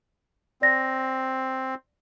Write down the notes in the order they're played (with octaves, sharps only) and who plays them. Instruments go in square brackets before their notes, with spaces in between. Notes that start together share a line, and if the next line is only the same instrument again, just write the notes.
[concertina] C4 [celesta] D5 A#6